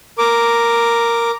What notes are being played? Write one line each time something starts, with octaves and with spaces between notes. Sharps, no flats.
A#4 D6